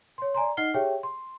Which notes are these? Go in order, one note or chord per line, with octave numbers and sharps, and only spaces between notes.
C#5 C6
D5 G#5 A#5 C6
D#4 D#5 F#5 F6 C7 G7
G4 G#4 C#5 E5 G5
C6